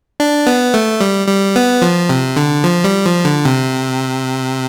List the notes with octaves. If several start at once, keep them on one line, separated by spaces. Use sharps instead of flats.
D4
B3
A3
G3
G3
B3
F3
C3
D3
F3
G3
F3
D3
C3